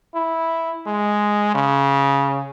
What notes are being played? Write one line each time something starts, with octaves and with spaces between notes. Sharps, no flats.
E4
G#3
C#3